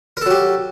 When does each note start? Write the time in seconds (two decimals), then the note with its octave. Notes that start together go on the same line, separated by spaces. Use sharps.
0.17 A#4
0.21 A4
0.26 F#3
0.30 G4